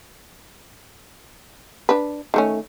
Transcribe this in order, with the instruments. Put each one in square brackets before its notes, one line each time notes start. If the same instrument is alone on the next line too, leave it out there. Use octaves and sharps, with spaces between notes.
[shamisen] D4 B4
D#3 A3 C#4